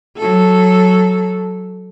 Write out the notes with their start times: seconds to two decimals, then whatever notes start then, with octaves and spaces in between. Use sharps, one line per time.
0.17 F#3 A4